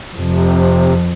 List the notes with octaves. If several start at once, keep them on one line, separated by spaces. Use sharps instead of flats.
F2 C3